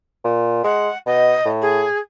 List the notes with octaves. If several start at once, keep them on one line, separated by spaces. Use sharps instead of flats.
A#2
G#3 F#5
B2 D#5
A2
G#4